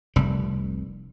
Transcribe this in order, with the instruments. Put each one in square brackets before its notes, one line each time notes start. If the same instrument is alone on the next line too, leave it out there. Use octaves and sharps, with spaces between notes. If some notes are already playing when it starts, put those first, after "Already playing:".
[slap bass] F1 C2 G3